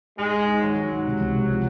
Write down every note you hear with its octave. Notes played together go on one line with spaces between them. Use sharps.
G#2 G#3
G#2
G#2
D#3 F#3
D#3
G#2
C3
C#2
C3
F3